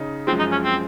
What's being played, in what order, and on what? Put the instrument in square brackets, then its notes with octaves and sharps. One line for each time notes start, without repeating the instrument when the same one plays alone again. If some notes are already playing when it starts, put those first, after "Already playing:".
Already playing: [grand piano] C#3 D#4
[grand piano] F#2 F3 G#3 [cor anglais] C4
[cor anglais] D#4
C#4
C4